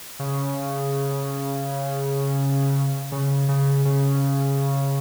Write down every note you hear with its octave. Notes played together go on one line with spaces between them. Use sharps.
C#3
C#3
C#3
C#3